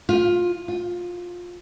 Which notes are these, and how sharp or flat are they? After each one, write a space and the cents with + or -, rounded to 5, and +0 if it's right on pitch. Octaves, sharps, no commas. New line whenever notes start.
F4 +15
F4 +15